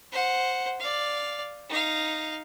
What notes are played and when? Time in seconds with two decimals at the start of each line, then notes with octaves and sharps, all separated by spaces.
0.12 C5 F#5
0.80 D5 F5
1.69 D#4 F5